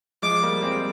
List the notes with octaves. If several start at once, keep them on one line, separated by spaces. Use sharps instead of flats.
F3 G#3 D6
G3 A#3
G#3 C4